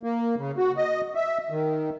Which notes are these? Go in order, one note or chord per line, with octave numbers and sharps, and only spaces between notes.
A#3
C#3
F#4
D#5
E5
D#3